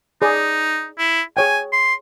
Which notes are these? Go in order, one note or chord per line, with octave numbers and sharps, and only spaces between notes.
D#4 G#4 D5
E4
G#4 C#5 G5 G#5
C6